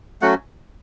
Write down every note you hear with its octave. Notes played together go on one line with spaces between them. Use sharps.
F#3 A3 C#4 F#4 F#5